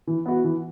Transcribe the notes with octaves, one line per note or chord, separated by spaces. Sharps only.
E3
B3 F#4
E3